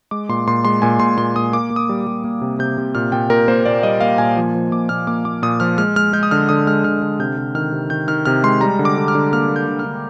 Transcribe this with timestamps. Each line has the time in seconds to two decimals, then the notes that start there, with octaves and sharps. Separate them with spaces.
0.11 G#3 D6
0.29 A#2 C6
0.47 A#2 C6
0.65 G#3 C6
0.82 A#2 G#5
1.00 A#2 C6
1.17 A#2 C6
1.36 A#2 D#6
1.53 A#3 D6
1.70 A#3
1.76 D#6
1.89 G3
2.07 G3
2.24 A#3
2.41 C3
2.59 C3 G6
2.78 C3
2.95 A#2 F6
3.12 A#2 G5
3.30 A#2 A#4
3.48 A#3 C5
3.66 A#2 D5
3.83 G3 D#5
4.01 A#3 F5
4.18 A#2 G#5
4.36 F3 G#5
4.55 F3
4.72 A#2 D6
4.89 A#2 F6
5.07 A#3 D6
5.25 A#3 D6
5.43 A#2 D#6
5.60 F3 F6
5.78 G#3 F6
5.96 G#3 F6
6.13 G#3 G6
6.23 D#6
6.31 D3 F6
6.49 D3 D#6
6.67 G#3 F6
6.84 D3 F6
7.02 D3
7.19 C3 G6
7.38 C3
7.55 D#3 F6
7.72 C3
7.90 D#3 G6
8.08 D#3 F6
8.25 C3 F6
8.44 G#3 C6
8.61 G3 A#5
8.79 D3
8.85 D6
8.97 D3
9.08 F6
9.15 D3
9.33 A#3 F6
9.49 A#3
9.56 G6
9.68 D3
9.79 F6
9.85 D3